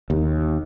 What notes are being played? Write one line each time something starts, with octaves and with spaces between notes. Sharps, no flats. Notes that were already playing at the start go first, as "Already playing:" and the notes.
D#2